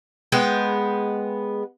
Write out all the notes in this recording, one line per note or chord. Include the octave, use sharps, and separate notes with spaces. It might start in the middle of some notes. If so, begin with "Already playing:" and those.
G#3 B3 G5